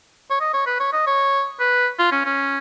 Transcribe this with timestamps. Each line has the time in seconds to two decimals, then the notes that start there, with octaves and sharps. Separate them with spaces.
0.30 C#5
0.41 D#5
0.54 C#5
0.66 B4
0.80 C#5
0.93 D#5
1.07 C#5
1.60 B4
1.99 F4
2.12 C#4
2.25 C#4